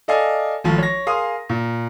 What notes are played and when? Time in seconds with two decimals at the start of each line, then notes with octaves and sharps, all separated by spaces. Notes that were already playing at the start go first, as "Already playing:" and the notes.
0.08 A4 D5 D#5 F5 G#5
0.64 G#1 F3 A3
0.78 C#5 A#6
1.07 G#4 A#4 F5 C6 D#6
1.49 A#2